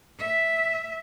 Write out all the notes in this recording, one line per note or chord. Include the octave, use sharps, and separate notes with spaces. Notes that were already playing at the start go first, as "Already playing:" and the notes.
E5